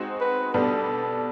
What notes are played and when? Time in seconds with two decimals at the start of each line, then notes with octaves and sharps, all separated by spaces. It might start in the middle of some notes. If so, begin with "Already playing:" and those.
Already playing: G#3 C4 D#4 F#4
0.21 B4
0.54 B2 G3 B3 D4 A4